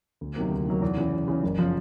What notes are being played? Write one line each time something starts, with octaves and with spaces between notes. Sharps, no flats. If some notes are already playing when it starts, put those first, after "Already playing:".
D2
C3 D#3 F#3 A#3
D2
C3 D#3 F#3 A#3
E2
C#3 E3
E2
C#3 E3
F#1
C#3 F3